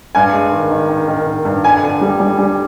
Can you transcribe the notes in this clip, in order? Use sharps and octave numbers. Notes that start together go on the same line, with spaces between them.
G2 G#5
G#3
D#3
D#3
D#3
D#3
D#3
G2
F2 G#5
D3
G3
G3
G3